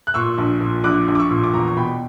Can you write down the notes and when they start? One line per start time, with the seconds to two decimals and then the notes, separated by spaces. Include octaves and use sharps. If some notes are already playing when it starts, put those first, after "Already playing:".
0.07 F#6
0.14 A#2 C#6 E6
0.38 A#1
0.61 A#2
0.84 A#1 D6 F#6
1.08 A#1
1.15 D6
1.19 C#6 E6
1.31 A#2
1.44 D6
1.53 E2 A#5 C#6
1.68 C#6
1.77 B2 G5 B5